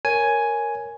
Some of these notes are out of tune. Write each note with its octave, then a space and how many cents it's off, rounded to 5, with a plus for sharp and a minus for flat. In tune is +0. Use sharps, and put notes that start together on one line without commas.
A#4 +0 C#5 +0 G#5 +5